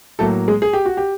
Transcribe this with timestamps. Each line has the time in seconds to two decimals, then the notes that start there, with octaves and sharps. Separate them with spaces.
0.19 A2 F#3 A3 A#3 A4
0.48 G#3 G#4
0.62 G#4
0.73 G4
0.86 F#4
0.97 G4